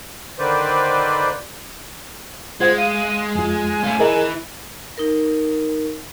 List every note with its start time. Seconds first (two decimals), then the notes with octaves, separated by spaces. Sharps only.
0.39 D3 D#3 B4 C5 D5
2.60 G#3 F4 C5 F#5 G#6
2.78 F5 D#7
3.35 F2 F4 G#5
3.84 A3 F4
3.99 E3 G#4 A#4 D#5
4.98 D#4 A#4